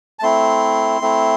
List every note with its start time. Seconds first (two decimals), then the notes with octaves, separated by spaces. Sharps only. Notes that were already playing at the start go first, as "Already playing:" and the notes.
0.19 A5
0.22 A3 C4 E4 C6
1.01 A3 C4 E4